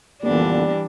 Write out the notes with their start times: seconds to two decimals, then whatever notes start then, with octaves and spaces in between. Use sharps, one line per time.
0.23 F2 A#2 D3 E3 G3 A#3 B3 D4